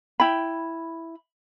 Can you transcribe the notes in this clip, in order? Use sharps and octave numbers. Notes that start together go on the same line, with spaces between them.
E4 G5 B5